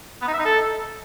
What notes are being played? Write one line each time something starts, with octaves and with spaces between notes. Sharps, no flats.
B3
D#4
E5
D#4
A4